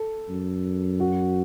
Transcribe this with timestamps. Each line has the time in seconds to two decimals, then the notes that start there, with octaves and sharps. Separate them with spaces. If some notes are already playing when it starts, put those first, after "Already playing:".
Already playing: A4
0.29 F#2
1.00 F#4